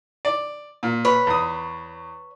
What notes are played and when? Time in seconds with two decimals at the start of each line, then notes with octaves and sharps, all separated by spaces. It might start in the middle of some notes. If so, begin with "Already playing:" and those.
0.25 D5
0.83 A#2
1.05 B4 C#5
1.27 E2 D#6